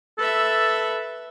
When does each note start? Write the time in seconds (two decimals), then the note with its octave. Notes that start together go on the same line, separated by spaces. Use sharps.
0.19 A4 B4 E5